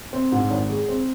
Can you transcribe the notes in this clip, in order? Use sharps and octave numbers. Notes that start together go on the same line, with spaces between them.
C4
G#2
G#1
G#3
C4